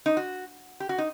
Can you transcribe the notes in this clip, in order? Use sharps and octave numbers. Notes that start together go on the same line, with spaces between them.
D#4
F#4
G4
F#4
D#4